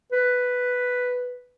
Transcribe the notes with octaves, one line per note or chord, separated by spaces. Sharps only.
B4